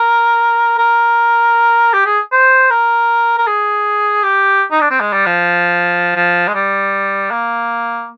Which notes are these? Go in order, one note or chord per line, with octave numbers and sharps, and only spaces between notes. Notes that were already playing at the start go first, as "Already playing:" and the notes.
Already playing: A#4
A#4
G4
G#4
C5
A#4
A#4
G#4
G4
D#4
D4
C4
G#3
G3
F3
F3
G#3
G3
A#3